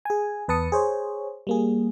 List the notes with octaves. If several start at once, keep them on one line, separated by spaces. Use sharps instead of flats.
G#4 G#5
E2 B4 A5 D#6 C#7
G#4 C5 C#5
G3 A#3 G#4